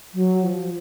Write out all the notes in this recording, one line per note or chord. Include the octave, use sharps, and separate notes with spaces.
F#3
F3